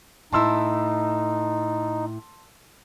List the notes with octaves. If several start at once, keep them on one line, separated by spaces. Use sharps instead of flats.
A2 D#4 E4 A5 C6 E6